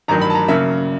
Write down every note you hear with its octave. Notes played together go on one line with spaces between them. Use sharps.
A1 G2 D#3 F#3 A#5
B5
A5
A#5
C#3 F#3 A#3 E5